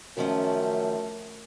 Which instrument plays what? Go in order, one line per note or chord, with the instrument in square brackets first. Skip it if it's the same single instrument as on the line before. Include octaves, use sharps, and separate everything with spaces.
[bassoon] F#2 [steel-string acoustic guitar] D#3 F3 C#4 [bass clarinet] A3